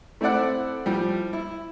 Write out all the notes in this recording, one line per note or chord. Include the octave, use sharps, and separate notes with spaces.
A3 C4 E4 D5 F#5
A2 F3 G3
E4